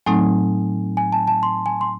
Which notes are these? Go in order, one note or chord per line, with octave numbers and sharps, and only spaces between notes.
A2 F#3 A3 C4 D#4 G#5
G#5
A5
A5
C6
G#5
C6